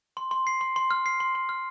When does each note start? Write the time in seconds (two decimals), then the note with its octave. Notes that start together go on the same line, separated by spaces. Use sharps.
0.17 C6
0.31 C6
0.47 C7
0.61 C6
0.76 C6
0.91 F6
1.06 C7
1.20 C6
1.35 C6
1.49 F6